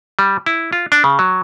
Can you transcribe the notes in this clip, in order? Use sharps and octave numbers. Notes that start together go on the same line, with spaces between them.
G3
E4
F4
D4
C#3
F#3